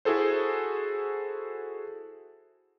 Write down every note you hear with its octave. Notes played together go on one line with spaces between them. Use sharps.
E4 F#4 G#4 A4 C5